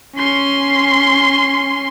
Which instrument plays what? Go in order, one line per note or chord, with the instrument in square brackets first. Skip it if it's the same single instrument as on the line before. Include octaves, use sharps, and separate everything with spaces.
[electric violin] C#4 C6